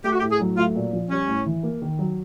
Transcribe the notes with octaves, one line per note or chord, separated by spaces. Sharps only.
A3 G4
F#4
A2 G4
G#4
F#3
A3 F4
A#2
F3
G3 C#4
A2
E3
A#3
D#3
F#3